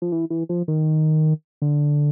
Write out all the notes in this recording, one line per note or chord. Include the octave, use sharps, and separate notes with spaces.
F3
E3
E3
F3
D#3
D3